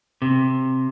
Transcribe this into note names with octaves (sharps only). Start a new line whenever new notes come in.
C3